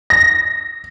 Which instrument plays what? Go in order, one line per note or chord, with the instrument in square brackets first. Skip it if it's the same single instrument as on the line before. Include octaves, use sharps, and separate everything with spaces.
[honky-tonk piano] A#6